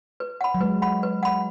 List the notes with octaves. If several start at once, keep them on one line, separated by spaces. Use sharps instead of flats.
B4
F#5 B5
F#3
G#3 B4
F#5 B5
B4
F#5 B5